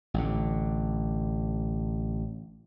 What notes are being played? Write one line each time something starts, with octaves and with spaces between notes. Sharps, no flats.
A1 D3